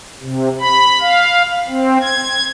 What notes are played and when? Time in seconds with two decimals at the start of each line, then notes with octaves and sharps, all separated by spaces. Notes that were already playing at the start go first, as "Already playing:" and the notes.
0.20 C3
0.60 B5
1.01 F5
1.68 C4
2.02 G#6